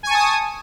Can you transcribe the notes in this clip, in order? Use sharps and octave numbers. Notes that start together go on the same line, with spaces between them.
G#5 A5 C#6 D#6